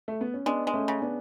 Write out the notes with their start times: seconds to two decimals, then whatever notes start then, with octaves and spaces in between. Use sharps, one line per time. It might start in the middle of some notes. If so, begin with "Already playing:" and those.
0.08 A3
0.21 B3
0.34 C#4
0.46 G#3 B3 D4
0.67 G#3
0.74 A3 C#4
0.88 C#3
1.02 B3 D4